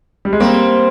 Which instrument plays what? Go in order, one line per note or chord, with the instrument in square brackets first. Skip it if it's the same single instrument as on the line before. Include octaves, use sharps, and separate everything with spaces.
[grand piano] G3
G#3
[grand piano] G3 A#3 [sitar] C4